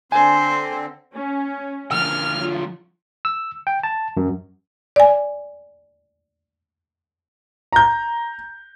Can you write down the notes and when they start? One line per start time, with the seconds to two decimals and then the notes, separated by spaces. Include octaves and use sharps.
0.12 D3 C4 C5 G#5
1.15 C#4
1.92 D3 F3 F6
2.36 F#3 F4
3.25 E6
3.67 G5
3.83 A5
4.17 F#2
4.96 D5 G#5
7.73 A#5 G6